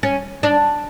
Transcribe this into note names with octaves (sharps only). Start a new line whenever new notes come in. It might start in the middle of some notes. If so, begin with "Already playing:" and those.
C#4
D4